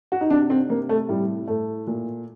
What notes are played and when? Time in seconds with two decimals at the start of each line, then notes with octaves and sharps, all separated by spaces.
0.12 F#4
0.21 D#4
0.30 C3 D4
0.50 C4
0.70 C3 A#3
0.89 A3
1.08 A2 G3
1.48 A2 A3
1.87 A#2